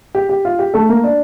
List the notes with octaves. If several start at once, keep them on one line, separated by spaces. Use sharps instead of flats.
G4
G4
F4
G4
A3 A4
A#3 A#4
D4 D5